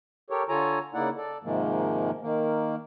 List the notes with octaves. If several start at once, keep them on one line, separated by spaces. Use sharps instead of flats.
G4 A4 A#4 C#5
D3 F4 A4 C#5 G#5 A#5
C#3 A#3 D#4 E4 D5 F#5
A4 D5
G#2 C3 D#3 F3 G#3 A#3
D#3 A#3